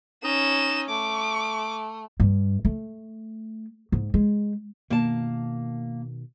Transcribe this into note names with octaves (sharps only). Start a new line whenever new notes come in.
C#4 D#4 E7
A3 D6
G2
A3
G#2
G#3
B2 D#3 A#3 A5